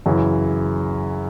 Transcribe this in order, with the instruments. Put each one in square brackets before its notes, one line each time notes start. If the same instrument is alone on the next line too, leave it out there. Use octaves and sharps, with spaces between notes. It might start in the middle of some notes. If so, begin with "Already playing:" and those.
[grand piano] F#2 C#3 E3